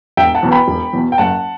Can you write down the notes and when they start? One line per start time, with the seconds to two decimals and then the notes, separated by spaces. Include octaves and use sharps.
0.17 E1 E5 G5
0.35 F#5 A5
0.43 E2 B2
0.51 G5 B5
0.68 E1
0.93 E2 B2
1.12 G5
1.18 F#1 F#5 A5